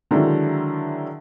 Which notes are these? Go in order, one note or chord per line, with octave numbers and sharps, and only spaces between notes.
D3 D#3 F#3 G#3 D4 E4